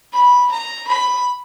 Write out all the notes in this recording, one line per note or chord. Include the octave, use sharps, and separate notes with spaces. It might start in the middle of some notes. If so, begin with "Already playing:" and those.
B5
A#5
B5